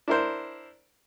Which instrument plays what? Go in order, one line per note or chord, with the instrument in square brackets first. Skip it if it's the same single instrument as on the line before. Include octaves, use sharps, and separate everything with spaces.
[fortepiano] D4 E4 A#4 C5